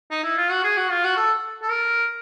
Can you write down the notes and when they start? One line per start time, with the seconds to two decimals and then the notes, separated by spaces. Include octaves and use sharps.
0.11 D#4
0.24 E4
0.37 F4
0.51 F#4
0.64 G#4
0.77 F#4
0.90 F4
1.04 F#4
1.17 A4
1.62 A4
1.70 A#4